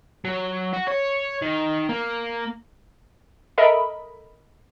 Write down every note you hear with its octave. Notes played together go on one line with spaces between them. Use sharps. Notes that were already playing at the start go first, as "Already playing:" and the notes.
F#3
F#4
C#5
D#3
A#3
A4 A#4 D#5 E5 B5